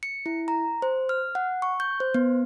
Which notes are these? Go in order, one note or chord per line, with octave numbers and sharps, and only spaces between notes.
C#7
E4
A#5
C5
F6
F#5
C#6
G6
C5
B3